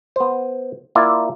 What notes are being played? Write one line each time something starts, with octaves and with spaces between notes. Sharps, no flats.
B3 C5
A#3 E4 F4 D5